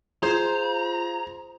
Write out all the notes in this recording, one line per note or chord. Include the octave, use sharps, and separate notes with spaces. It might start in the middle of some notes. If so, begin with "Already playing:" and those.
F4 G#4 C5 A#5